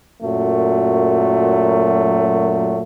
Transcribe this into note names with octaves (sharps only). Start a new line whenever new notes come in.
F#2 A#2 F#3 A3